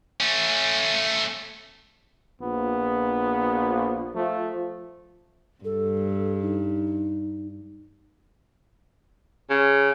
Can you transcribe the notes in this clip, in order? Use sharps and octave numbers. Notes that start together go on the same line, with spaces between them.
A3 C#4
A#1 B3
F3 A3
G2 A4
D#4
C#3